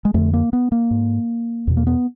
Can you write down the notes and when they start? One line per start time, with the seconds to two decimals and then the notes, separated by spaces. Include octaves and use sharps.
0.05 G#3
0.14 F2 D3 A3
0.33 A#3
0.53 B3
0.72 A#3
0.91 G#2
1.67 E2 B2
1.77 A#3
1.87 B3